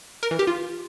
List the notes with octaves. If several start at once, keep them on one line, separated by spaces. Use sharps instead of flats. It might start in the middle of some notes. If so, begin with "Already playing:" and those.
A#4
E3
G4
F4